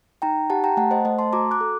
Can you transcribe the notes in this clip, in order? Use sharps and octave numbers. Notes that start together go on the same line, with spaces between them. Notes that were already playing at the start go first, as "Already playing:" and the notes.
D#4 G5 A#5
G4 F#5 A5
G5 A#5
A3 F#5 A5
C5 D#5
A3 C5 D#5
A5 C6
F#4 A#5 D6
D6 F#6
A4